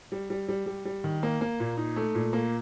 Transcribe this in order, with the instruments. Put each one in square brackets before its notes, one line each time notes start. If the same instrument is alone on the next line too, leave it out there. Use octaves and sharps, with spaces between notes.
[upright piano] G3
G3
G3
G3
G3
D#3
A#3
A#3
A#2
D#4
A3
A#2
A#3